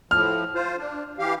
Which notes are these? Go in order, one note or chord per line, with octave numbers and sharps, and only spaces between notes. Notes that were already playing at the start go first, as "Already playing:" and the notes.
A2 F3 F6
F4 C5
D4
E3 G4 F5